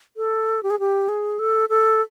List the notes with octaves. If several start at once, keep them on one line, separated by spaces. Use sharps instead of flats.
A4
G4
G#4
G4
G#4
A4
A4